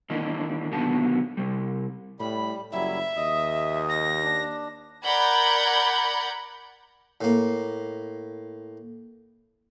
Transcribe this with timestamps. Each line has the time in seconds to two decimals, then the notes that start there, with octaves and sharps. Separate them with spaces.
0.10 D#3 E3 A#3 C#4 D4 D#5
0.72 B2 D3 D#3 F#3 B3 A5
1.37 C3 G3
2.20 A2 G3 B5
2.72 F#1 F#3 G3 E4 E5
3.17 D#2 D#5 D#6
3.89 A#6
4.24 D4
5.05 A#4 D5 F#5 B5 G6 G#6
7.21 A2 A#3